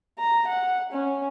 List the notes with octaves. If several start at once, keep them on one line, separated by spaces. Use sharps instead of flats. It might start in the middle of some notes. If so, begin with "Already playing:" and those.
A#5
F#5
C#4